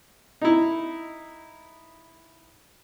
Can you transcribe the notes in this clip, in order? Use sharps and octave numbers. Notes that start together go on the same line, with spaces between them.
D#4 E4